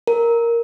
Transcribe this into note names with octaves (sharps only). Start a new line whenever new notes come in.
A#4